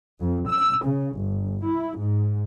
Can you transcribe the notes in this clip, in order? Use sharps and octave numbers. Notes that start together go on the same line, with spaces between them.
F2
E6
C#3
G1
E4
G#2